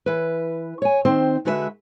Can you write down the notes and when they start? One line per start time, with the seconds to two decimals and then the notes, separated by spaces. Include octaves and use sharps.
0.06 E3 B4
0.82 C#5 G#5
1.05 D#3 C4 C5
1.45 D3 G#3 F#4 B4 D5 E5